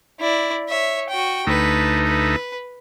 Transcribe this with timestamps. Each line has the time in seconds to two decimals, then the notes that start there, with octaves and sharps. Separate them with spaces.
0.20 E4 D5
0.69 C#5 E5
1.09 F#4 G5
1.47 D2 A3 D#4 B4
2.06 B4